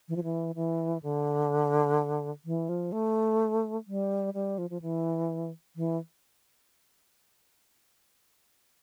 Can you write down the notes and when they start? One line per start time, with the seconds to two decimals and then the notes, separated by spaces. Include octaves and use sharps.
0.09 E3
0.16 F3
0.24 E3
0.55 E3
1.03 D3
2.45 E3
2.69 F3
2.92 A3
3.87 G3
4.34 G3
4.58 F3
4.70 F3
4.82 E3
5.76 E3